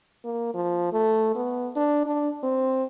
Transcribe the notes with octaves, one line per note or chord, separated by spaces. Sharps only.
A#3
F3
A3
B3
D4
D4
C4